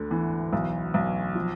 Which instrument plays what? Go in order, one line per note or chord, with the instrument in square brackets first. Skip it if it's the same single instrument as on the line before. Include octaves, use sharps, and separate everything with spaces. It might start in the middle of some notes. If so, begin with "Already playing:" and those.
Already playing: [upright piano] D2 D3
E3
B1
B1
F3